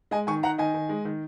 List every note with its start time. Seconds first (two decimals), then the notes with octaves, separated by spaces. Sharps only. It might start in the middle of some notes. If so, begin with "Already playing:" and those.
0.11 G#3 D#5 G#5
0.27 D#3 G#5 C#6
0.43 D#3 F#5 A#5
0.58 D#3 D#5 G#5
0.74 D#3
0.89 G#3
1.05 D#3